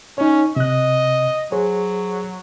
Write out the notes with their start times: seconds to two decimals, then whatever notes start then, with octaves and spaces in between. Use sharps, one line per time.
0.18 C#4 D#4 C#5
0.56 C3 D#5 F#6
1.52 F#3 G#4 C5 C#5